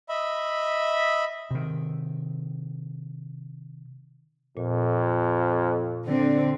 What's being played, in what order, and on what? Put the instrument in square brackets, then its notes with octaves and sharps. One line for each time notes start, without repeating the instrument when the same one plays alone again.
[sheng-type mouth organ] D#5 E5 B5
[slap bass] C3 D#3
[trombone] F2 [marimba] A#2
[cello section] D3 C4